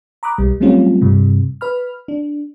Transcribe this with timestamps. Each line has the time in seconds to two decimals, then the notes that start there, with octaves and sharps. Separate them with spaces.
0.23 A#5 B5 D6 D#6 F#6
0.38 B1 G3
0.60 F#3 G3 A3 C4 C#4 F4
1.01 G2 C3 G3
1.61 B4 B5 F6
2.08 D4